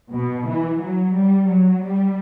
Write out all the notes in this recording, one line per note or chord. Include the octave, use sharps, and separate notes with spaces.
B2
E3
F#3
G3
F#3
G3